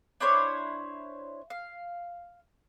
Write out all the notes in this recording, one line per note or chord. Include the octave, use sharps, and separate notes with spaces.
D4 E4 C5 C#5
F5